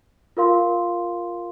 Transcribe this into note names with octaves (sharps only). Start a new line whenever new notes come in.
F4 A#4 F5 C6